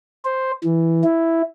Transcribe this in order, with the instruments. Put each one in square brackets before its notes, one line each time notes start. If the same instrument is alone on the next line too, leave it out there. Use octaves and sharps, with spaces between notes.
[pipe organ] C5
E3
E4